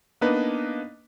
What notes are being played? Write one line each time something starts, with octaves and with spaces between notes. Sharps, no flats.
A#3 B3 D4 D#4 B4 D#5